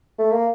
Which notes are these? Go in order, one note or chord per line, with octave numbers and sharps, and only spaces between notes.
A3
A#3